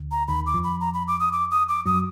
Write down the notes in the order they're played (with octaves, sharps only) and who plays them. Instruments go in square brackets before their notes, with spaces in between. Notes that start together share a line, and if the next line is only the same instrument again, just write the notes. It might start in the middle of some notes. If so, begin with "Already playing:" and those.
Already playing: [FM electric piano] D2 D3
[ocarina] A#5
[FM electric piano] D#2 D#3 [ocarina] B5
[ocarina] D6
[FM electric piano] F2 F3
[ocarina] B5
A#5
B5
D6
D#6
D6
D#6
D6
[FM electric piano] F#2 F#3 [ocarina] D#6